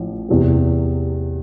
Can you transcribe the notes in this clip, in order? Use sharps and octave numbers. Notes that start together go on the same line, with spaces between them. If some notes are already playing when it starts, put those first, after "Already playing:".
Already playing: A1 A2 F3
E2 C3 E3